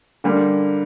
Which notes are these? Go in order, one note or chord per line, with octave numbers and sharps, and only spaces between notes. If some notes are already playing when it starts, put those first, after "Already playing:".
D3 G3 A#3